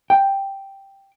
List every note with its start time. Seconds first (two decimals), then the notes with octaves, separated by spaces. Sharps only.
0.10 G5